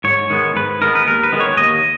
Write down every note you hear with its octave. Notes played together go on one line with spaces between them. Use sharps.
G#2 C#5
D#3 G#3 B3
G#2 B4
D#3 G#3 B3 A#4
B4
D#2 A#4
B4
D#3 G#3 B3
C#5
D#2 D#5